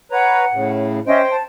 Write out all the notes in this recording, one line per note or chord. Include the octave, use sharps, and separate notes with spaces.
B4 C#5 F#5 A#5
A2 C#3
C#4 C5 D#5 E5 G5
A5